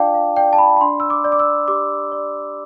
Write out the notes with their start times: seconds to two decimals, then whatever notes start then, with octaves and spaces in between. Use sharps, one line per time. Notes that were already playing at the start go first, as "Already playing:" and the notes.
Already playing: D4 F4 D5 F5 G5 A5 D6
0.14 F5
0.36 D5 G5
0.53 A5
0.58 B5
0.76 B5
0.81 D4 C6
1.00 E6
1.10 D6
1.24 D5
1.32 D6
1.39 E6
1.68 G4 D6
2.12 D5